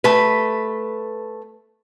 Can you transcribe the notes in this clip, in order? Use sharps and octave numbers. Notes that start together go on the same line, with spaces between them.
A3 B4